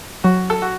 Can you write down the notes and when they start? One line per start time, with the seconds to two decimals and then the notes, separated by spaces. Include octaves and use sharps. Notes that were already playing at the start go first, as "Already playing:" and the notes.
0.24 F#3 F#4
0.50 A4
0.62 F#4